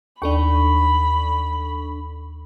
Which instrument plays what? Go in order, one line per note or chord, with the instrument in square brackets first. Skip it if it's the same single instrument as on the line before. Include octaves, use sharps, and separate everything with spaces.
[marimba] D#2 [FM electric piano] D4 A4 C#6 [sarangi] B5